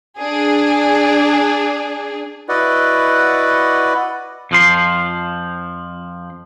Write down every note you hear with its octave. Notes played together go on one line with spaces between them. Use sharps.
D4 G#4
E4 F#4 B4 D5 D#5 F#5
F2 F3 C6